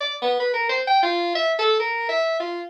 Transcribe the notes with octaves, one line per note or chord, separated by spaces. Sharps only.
D5
B3
B4
A#4
C5
G5
F4
E5
A4
A#4
E5
F4